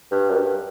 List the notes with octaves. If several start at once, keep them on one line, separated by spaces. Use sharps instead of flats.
G2
F#2
G2